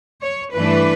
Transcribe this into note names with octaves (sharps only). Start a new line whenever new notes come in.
C#5
G2 E3 A3 D4 B4